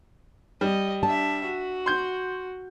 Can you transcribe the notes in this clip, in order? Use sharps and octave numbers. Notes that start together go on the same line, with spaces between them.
G3 D#5
D4 E5 A5
F#4
C6 G6